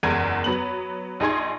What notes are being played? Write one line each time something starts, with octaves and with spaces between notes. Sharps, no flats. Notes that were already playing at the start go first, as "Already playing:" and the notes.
F#1 E2 G#3 A#4 G#6 D#7
F#3 B3 F#7
A#1 D#4 G#4 C6 G#6